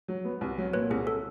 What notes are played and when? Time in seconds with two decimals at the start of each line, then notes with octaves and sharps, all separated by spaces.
0.08 F#3
0.25 B3
0.41 C2
0.58 F#3
0.73 A#2 B4 C#5
0.90 C2 G#4
1.07 A4